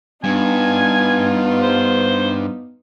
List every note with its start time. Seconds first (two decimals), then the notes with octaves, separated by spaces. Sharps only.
0.24 G2 B3 D#4 F4 G#5
1.62 C5